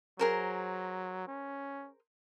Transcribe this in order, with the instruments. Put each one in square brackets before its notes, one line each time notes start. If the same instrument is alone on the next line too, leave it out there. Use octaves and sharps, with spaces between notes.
[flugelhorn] F#3 [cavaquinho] G#4 A#4 C5
[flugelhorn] C#4